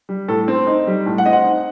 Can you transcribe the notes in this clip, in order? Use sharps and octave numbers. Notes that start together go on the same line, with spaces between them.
G3
A2 A4
C4
D#4
G3
A2
F#5
C4 D#5
F#5
D#4